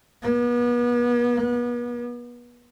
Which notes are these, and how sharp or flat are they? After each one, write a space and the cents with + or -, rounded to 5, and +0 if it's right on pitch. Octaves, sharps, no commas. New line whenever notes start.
B3 -35